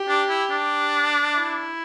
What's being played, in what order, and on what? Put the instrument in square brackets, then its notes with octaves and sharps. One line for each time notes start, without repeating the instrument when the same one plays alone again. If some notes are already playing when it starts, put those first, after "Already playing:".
Already playing: [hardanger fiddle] G4
[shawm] D4
E4
D4
[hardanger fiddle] E4